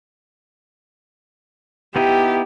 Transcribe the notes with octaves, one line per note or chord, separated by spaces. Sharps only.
B3 D#4 E4 G4